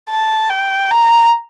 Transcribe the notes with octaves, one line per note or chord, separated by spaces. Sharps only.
A5
G5
A#5